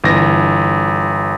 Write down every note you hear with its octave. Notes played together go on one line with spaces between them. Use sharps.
G1 E3 A#6